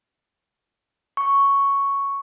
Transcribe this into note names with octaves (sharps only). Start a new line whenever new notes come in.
C#6